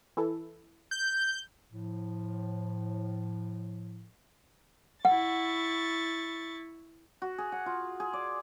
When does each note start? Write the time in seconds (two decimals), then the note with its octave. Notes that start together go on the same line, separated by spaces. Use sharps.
0.17 E3 E4 A4
0.91 G6
1.72 A2 F3
5.05 E4 F#5 C#6 A6
7.22 F#4
7.38 G#4
7.52 F#5
7.66 F4
8.00 G#4
8.13 D5